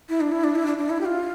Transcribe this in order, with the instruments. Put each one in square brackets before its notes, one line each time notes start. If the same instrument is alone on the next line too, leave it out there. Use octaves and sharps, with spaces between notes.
[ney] E4
D4
E4
D4
E4
D4
D4
E4
G4
F4